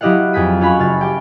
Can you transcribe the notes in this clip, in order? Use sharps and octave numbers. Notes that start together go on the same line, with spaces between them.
F#3 E4 G4 D#5 F5 F#5
F2 C4 G#4 G6 B6 D#7
C#4 F4 F#4 F5 B5 C#6
F#1 F5 A6
G4 G5